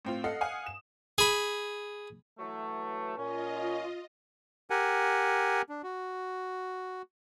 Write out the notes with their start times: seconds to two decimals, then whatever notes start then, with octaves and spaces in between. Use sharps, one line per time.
0.05 A2 C4 F4
0.24 A4 D#5 F5 F#5
0.41 F5 F#5 G#5 D#6
0.66 E7
1.18 G#4 B5
2.39 E3 F#3 A3
3.18 A#2 C#4 F4 D#5
4.70 G4 A#4 F#5 G#5
5.69 D4
5.83 F#4